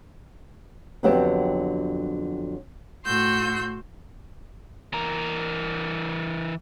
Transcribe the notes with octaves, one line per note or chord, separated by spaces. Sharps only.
F2 D3 F#3 B3 C4 G4
A2 F#4 C6 E6 G6
E3 A#4